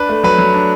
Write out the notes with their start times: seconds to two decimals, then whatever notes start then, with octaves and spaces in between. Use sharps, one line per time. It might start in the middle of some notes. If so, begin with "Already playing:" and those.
Already playing: D4 B4
0.09 A3
0.24 F#3 B4
0.38 F#3
0.54 D4